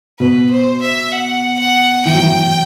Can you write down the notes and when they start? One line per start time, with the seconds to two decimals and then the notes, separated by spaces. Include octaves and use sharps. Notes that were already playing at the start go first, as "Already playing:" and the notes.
0.19 B2 B4
0.50 C5
0.82 E5
1.12 F#5
1.59 F#5
2.05 E3 G5
2.14 F#3
2.23 E3